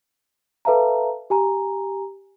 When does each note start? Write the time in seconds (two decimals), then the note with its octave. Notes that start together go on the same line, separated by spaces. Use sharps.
0.65 A4 B4 E5 F5 A5 A#5
1.30 G4 G#5 A#5